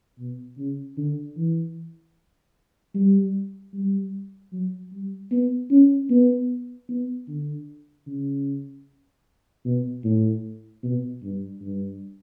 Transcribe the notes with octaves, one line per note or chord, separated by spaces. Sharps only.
B2
C#3
D3
E3
G3
G3
F#3
G3
B3
C#4
B3
B3
D3
C#3
B2
A2
B2
G2
G2